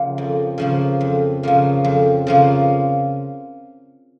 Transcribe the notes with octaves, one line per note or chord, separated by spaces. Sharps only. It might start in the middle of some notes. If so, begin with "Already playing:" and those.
Already playing: C#3 F3 A#3
F2
C#3 F3 A#3
F2
C#3 F3 A#3
F2
C#3 F3 A#3